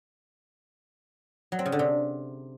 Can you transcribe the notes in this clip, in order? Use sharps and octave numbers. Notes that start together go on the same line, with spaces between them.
F#3
C4
C#3
D3
C3